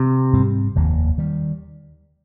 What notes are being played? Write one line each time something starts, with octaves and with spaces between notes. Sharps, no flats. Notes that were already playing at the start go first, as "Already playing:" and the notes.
Already playing: C3
G#2 G3 C4
F1 D#2 D#3 A#3
D#3 G3